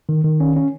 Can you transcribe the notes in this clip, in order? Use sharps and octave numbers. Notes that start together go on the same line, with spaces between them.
D#3
D#3
C#4
C#4